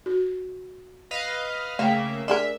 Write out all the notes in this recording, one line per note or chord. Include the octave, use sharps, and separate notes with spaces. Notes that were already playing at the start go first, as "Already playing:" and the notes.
F#4
B4 D#5 F5
C#3 A3 A#3 E5 F5 G5
D4 G#4 A#4 E5